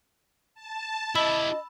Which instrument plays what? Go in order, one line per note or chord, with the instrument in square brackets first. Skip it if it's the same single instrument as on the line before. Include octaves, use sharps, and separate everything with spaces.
[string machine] A5
[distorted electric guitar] E4 G4 [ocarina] D#5 [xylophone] B5 E6